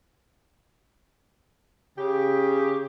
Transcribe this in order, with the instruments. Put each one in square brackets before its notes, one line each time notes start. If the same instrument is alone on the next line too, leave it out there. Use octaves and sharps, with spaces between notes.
[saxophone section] C#3 G4